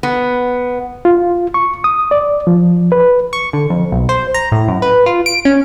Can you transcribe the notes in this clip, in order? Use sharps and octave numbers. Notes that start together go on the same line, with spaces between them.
B3
F4
C#6
D#6
D5
F3
B4
C#6
D3
F2
B1
C5
A#5
A2
F#2
B4
F4
D7
C#4